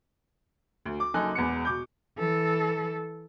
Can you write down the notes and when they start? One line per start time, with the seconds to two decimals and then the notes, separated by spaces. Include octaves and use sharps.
0.86 D2
1.00 D6
1.14 F#1 F#2 D#4 A4 G#5 F#6
1.35 E1 E2 B3 C#7
1.65 B2 D6 G6
2.18 E3 A4